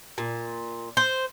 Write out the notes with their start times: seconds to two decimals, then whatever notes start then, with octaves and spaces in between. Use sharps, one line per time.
0.18 A#2
0.97 C5